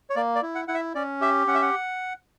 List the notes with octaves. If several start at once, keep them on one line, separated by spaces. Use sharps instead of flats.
C#5
A#3 D5
D5
E4
F#5
E4 F#5
E5
C#4 D5
G4 E5
C#4 F#5
E5
F#5